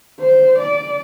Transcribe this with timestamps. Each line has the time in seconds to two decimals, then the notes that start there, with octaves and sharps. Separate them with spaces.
0.20 C5
0.58 D5